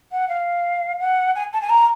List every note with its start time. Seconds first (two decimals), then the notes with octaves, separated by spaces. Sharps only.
0.12 F#5
0.28 F5
0.99 F#5
1.35 G#5
1.53 A5
1.61 G#5
1.69 A#5